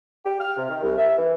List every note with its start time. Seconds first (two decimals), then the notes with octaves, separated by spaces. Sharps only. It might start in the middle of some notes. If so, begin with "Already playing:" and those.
0.25 G4
0.40 F6
0.57 C3
0.69 D#3
0.83 C2
0.97 E5
1.17 E3